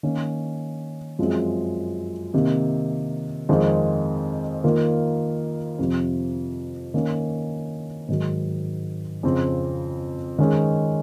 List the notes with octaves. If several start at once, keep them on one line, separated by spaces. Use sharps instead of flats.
D#3 A#3 C#4
F#2 F3 G#3 C4
C3 D#3 A#3
F2 D#3 G#3 C4 F4
D#3 A#3 F4 A#4
F2 C3 F3
D#3 A#3 C#4
G#2 D#3 F#3
F2 C#3 F3 C4
D#3 G#3 C#4